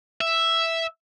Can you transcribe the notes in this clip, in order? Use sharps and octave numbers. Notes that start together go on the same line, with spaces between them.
E5